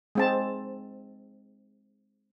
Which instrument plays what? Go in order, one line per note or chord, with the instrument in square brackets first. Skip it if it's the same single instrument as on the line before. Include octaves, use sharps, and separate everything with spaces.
[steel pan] G#3 C4 A5